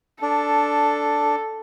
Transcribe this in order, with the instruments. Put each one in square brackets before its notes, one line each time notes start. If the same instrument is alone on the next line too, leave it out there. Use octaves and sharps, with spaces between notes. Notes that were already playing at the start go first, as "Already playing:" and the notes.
[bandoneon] D4 [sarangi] A4